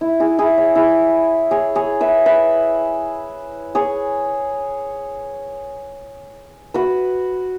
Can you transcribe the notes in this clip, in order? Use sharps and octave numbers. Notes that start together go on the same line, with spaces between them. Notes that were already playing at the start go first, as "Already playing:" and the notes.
E4
E4 G#4
E4 G#4
G#4 C#5
E4 G#4
G#4 C#5
G#4 C#5
B4 E5
B4 E5
G#4 C#5
F#4 B4